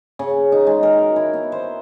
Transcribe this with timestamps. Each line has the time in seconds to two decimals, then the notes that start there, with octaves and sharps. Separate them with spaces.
0.19 C#3
0.52 D#4
0.67 G#3
0.83 A#4
0.98 F#4
1.16 E4
1.34 B3
1.52 C5